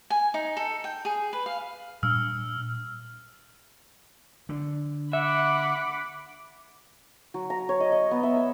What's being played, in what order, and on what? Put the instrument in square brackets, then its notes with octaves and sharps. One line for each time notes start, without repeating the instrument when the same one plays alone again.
[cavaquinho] G#5
D#4
A4
G5
G#4
B4
F5
[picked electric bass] A#2 G3 D4 [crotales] E6 F6
[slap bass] D3
[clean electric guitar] E5 [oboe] F#5 [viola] B5 D6
[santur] F#3
A#5
C#5
D#5
D#5
B3
E5
E6